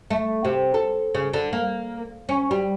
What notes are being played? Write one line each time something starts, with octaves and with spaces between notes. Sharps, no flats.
A3
C3
A4
C#3
D3
A#3
C#4
G3